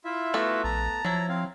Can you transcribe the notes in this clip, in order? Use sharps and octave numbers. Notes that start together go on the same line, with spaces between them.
E4 F4 E5
A3 B3 F#4 A4
A#1 A5 A#5
F3 F#3 E4
C4 F5